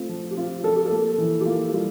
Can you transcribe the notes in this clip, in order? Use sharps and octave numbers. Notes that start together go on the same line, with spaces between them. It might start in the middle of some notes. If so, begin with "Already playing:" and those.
Already playing: A3 C4 F4
F3
G4
C4 F4
F3 A4
G4
A4
A#3
E3
G4
A#3 F4
G3 F4